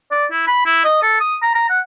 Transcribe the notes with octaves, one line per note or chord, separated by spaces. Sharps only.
D5
E4
B5
E4
D#5
A4
D#6
A#5
A#5
F#5